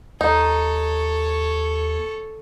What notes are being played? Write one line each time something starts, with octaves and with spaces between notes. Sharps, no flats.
D#2 D#4 A4 C#5